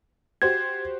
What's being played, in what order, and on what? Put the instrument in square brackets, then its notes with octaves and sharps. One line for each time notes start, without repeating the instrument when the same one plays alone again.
[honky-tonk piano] F#4 G4 C5 [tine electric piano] G#6